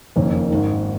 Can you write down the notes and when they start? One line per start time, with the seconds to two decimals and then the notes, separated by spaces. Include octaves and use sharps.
0.16 F#1 F2 D#3 A#3 C#4
0.51 G#1 G#2 D#3